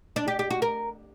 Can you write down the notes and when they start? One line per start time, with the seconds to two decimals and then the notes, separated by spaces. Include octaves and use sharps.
0.16 D4
0.28 G4
0.39 G4
0.51 F#4
0.62 A#4